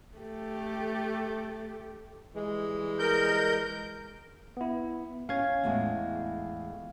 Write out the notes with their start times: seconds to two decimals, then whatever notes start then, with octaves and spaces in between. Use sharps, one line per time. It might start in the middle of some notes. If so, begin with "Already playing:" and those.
0.17 A3 G4
2.35 E3 G3 G#3
2.99 A#4 G6
4.57 B3 E4
5.29 C#4 F5 G#6
5.64 E2 A2 G#3